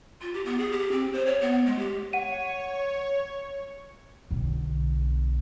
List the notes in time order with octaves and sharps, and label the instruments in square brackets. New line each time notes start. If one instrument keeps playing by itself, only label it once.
[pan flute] F4
G4
B3
G#4
G4
C4
C5
C#5
B3
G#3
G4
[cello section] C#5 [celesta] F#5 D#7
[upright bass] B1 D3